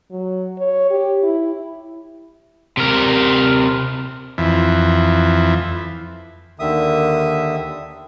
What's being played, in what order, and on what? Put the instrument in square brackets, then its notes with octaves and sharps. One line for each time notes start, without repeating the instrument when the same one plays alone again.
[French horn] F#3
C#5
G4
E4
[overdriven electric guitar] C3 A#4
[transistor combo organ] F2 E3
[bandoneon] D#2 D3 D#3 E5 D#6